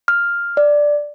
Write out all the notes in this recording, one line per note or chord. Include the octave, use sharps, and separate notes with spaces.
F6
D5